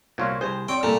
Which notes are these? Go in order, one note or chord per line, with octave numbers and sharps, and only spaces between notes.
C2 A#2 F#4 C#5 F5 C6
C2 C3 G#4 C5
C4 C#5 D5 G5 C#6
C2 A#2 A3 A#3